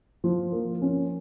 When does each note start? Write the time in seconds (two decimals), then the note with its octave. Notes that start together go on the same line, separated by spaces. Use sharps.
0.24 F3
0.52 A#3
0.82 C#4